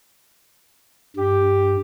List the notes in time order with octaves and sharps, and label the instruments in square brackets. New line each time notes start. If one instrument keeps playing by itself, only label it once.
[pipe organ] G2 [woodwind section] G4